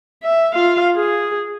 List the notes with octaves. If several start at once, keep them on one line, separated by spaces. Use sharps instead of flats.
E5
F4 F5
G#4